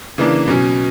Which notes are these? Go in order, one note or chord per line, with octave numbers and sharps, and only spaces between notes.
C#3 E3 A#3 D4
B2 F#3 C#4